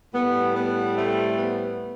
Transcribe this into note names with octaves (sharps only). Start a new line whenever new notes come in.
A2 G3 B3
B3
A3 C4
B3